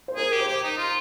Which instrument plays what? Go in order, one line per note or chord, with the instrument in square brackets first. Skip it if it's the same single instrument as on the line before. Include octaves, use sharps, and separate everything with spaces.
[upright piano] C5
[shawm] G#4 [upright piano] A#4
[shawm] G4
[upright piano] C5
[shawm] G4
D#4
F4